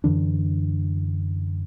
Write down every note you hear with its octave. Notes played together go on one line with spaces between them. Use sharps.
F#2 D3 E3 D4